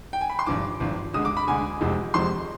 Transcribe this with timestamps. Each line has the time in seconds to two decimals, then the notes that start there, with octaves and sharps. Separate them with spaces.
0.13 G5
0.21 G#5
0.30 B5
0.39 C6
0.47 G#1 G2 F3 D6
0.80 G#1 G2 F3
1.14 D2 D3 G#3 D#6
1.25 D6
1.37 B5
1.47 D2 D3 G#3 G#5
1.81 F1 F2 C3 F3 G#3
2.14 F1 F2 C3 F3 G#3 C6